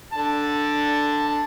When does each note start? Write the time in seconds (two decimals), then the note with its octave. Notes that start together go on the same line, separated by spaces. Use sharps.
0.13 D3 A5